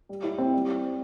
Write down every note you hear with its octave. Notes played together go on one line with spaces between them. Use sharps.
G3
E4
C4
G3